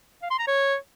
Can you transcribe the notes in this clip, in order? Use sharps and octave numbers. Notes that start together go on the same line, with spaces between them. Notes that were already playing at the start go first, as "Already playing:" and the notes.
F5
C6
A#5
C#5